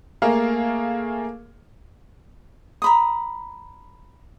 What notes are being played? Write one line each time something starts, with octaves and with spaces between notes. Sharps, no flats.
A3 A#3 G#4 A#4 F5
A#5 B5 D#6